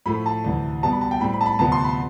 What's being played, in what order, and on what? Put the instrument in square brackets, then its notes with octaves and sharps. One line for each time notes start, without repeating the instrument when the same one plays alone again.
[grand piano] A2 F3 A3 B5
A5
D2 C3 E3
B2 G3 B3 A5
B5
A5
G5
A2 G3 C4 B5
B5
A5
B5
D2 C3 F3 B3 A5
C6
B5